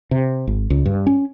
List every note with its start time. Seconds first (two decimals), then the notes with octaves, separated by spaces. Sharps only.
0.11 C3
0.47 G#1
0.70 C#2
0.86 G2
1.07 C#4